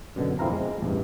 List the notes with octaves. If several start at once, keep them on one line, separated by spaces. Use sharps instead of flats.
F#2 B2 D3
B1 F2 C4 E4 F5 A#5
G#3
A1 E2 G2